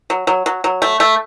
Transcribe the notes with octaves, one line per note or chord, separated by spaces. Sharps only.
F#3
F#3
F#3
F#3
A3
A3